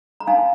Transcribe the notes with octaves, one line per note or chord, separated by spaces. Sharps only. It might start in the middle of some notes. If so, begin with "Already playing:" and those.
A#5
D#4 F5 G#5